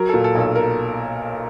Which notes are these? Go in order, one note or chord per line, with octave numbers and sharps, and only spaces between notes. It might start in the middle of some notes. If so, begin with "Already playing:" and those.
Already playing: F#3 A#4
A#2 A4
A4
B1
A4
A#4